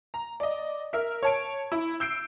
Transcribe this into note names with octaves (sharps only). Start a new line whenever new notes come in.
A#5
D5 D#5
A#4 E5 F6
C#5 A5 D7
E4
E6 G6 C7 D7